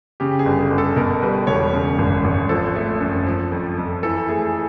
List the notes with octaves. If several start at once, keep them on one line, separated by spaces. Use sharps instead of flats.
C#3 G4
G#4
G1
G#4
G1
A4
B2 A#4
G3 B4
E1 C#5
C#3
G#1
G#1
F3 A4
A3
F#2
F3
F2
F2
E3 A4
A3 G#4